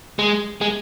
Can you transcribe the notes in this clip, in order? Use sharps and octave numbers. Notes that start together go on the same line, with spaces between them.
G#3
G#3